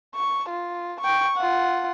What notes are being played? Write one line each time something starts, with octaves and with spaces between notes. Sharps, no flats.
C#6
F4
G5 C#6
F4 F#5